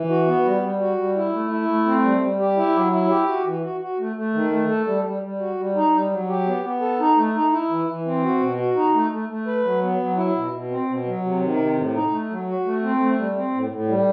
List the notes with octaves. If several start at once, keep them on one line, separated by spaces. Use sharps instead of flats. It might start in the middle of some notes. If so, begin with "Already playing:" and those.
Already playing: E3
F#4
B3
G3
G3
F#4
G3
E4
A3
E4
A3
C4
G3
G3
G4
E4
F#3
E4
G4
F#4
E3
F#4
F#4
A3
A3
D#3
A3
A4
G3
G3
G3
F#4
G3
D#4
G3
F#3
G4
B3
B3
A4
D#4
A3
D#4
E4
E3
E3
C4
F#4
B2
F#4
D#4
A3
A3
A3
B4
F#3
B3
F#3
E4
B2
B2
C4
B2
F#3
C3
D#3
C3
A2
D#4
A3
F#3
F#4
A3
C4
A3
G3
C4
A2
A2
G3